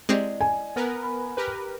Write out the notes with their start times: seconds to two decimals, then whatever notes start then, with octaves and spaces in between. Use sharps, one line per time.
0.09 G#3 C4 E4 G4 D5 D#5
0.41 G#5
0.76 B3 A#4 B4
1.03 B5
1.37 G4 A#4 B4